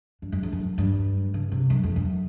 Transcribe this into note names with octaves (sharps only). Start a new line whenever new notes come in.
G2
F#2
F2
F#2
G2
C#3
C3
F#2
F2
F#2